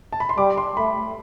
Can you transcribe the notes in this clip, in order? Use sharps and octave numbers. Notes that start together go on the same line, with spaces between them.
A5
B5
C6
G3 D6
C6
A3 B5